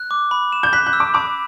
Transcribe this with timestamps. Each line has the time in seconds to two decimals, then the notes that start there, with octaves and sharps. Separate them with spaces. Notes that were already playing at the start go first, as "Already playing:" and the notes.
Already playing: F#6
0.11 D6
0.31 B5
0.52 E7
0.63 G6
0.73 F#6 B6
0.86 F#6
0.93 E6
1.00 D6
1.14 B5 D6